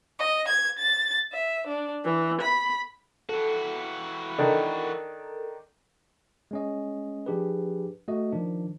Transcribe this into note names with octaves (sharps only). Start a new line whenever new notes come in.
D#5
G#6
A6
E5
D4
E3
B5
E3 F#4 A4
D#3 D4 A4 A#4
G#3 C#4 D#5
F3 D4 G4 G#4 B4
A3 F#4 D#5
D#3 F3 D4